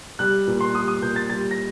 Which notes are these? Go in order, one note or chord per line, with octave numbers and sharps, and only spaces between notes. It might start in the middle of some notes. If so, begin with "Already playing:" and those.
G3 F#6
A#2
C6
G3 D#6
D#6
A#2 G6
A6
G3 A6
A#6